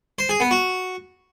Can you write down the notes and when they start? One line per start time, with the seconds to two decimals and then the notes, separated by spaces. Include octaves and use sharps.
0.19 C5
0.29 G#4
0.40 B3
0.51 F#4